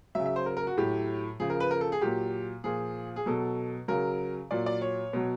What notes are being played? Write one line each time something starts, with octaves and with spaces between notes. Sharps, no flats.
C#3 F#3 E5
E5
C5
A#4
A#4
F#4
A2 F#3 G4
C#3 F3 G#4
A#4
B4
A#4
A4
G#4
A#2 F#3 G4
A#2 F3 G#4
G#4
B2 F#3 A4
C#3 F#3 A#4
A#2 F#3 D5
D5
C#5
B2 F#3